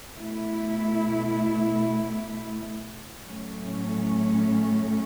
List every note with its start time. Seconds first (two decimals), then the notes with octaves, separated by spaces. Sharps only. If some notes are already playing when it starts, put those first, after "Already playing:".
0.14 B2 A3 E4
3.23 A2 F#3 A3 C#4